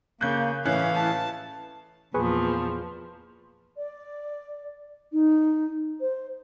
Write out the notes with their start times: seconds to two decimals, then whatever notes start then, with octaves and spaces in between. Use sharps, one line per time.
0.21 C#3 A#3 F#6 G6
0.65 A2 E3 C#4 F5 F#6
0.96 A5
2.14 E2 A#2 F3 G#4 B4 C#6
3.77 D5
5.12 D#4
6.00 C5